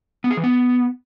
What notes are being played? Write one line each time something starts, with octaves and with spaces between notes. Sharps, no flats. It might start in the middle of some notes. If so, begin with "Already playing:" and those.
B3
G#4
E3
B3